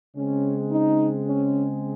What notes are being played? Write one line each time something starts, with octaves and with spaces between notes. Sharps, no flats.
C#3 G#3 C4 C#4
D#4
C#4